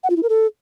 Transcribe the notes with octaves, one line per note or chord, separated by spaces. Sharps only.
F#5
F4
E4
A#4
A4